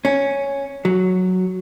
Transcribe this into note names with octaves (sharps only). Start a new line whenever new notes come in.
C#4
F#3